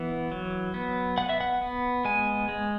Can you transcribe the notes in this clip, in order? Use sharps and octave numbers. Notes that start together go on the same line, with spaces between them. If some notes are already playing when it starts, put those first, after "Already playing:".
Already playing: E3 B3
F#3
B3
B3 F#5
E5
F#5
B3
G#3 G#5
G#3